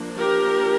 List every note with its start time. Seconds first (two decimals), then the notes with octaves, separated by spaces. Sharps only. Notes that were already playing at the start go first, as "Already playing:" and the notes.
Already playing: F3 A#3 D4
0.16 G4 A#4